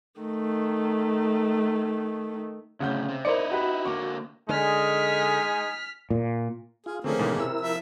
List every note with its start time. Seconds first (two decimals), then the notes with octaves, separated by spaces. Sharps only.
0.20 D#3 A3
2.80 D2 A2 C#3 F#5 G6
3.08 C3
3.25 D#4 E4 A#4 C5 D5 C#7 F7
3.52 F#4 G4 B4
3.85 D3 A#3 C#6 D6
4.49 D3 G#3 D#4 G#5 F6 B6
6.10 A#2
6.86 F4 G#4
7.04 D3 F3 A3 A#3 C4 C#4 G#4
7.19 D#2 G#2 B2 D3 E3 G#3
7.39 C3 E4 A#4 E6
7.61 F3 E5